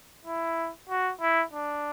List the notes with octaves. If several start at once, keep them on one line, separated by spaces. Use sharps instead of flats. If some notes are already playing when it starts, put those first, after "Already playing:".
E4
F#4
E4
D4